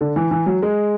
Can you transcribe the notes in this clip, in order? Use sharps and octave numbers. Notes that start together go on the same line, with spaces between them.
D3
E3
E3
F#3
G#3